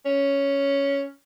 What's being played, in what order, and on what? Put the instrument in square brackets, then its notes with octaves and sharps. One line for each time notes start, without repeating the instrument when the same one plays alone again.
[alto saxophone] C#4